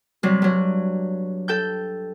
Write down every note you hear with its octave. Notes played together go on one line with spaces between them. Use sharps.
C3 F#3 G3
G2 F#3
A4 G5 G6